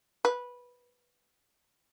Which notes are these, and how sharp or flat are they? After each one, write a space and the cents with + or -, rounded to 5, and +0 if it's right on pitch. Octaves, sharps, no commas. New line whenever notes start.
B4 -10